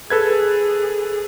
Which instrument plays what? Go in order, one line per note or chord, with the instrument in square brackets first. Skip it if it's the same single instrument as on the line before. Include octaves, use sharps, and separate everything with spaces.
[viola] G#4 [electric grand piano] A4 B4 G#6